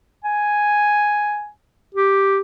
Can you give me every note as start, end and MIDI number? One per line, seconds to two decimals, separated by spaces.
0.24 1.48 80
1.95 2.41 67